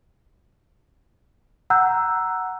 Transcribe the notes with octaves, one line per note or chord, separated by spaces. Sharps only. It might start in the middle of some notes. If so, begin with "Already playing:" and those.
F#5 A#5 E6 F#6 G6